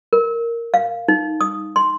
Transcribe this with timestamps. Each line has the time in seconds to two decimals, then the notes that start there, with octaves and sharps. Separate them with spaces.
0.13 A#4
0.74 F5
1.08 D#4
1.41 D#6
1.76 C6